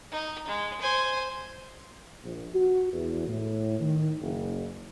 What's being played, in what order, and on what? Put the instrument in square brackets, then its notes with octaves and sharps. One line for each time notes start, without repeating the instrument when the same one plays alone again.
[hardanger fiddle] D#4
G#3
C5 G#5
[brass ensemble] A#1
F#4
E2
A2
D#3
F#1